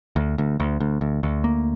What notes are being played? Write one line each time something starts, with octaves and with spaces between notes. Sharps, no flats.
D2
D2
D2
D2
D2
D2
A#3